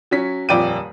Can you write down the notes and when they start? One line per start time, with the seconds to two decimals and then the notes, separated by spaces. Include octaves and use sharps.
0.11 F#3 C#4 B6
0.49 D#1 F2 D5 G5 D#7